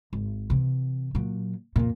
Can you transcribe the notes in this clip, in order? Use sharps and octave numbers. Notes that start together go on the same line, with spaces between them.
G#1
C3 E3
A#2 F#3
F2 A#2